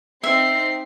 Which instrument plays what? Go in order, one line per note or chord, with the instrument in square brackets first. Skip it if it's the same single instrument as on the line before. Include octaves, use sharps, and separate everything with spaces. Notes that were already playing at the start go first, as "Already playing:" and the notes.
[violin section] C4 D#4 C7 [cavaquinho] E5